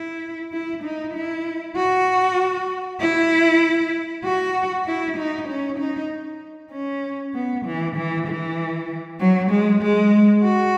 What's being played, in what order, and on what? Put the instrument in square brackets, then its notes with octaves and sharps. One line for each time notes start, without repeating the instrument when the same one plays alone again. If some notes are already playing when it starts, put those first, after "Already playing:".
Already playing: [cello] E4
E4
D#4
E4
F#4
E4
F#4
E4
D#4
C#4
D#4
C#4
B3
E3
E3
E3
F#3
G#3
G#3
F#4